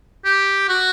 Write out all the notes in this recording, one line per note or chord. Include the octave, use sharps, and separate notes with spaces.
G4
F#4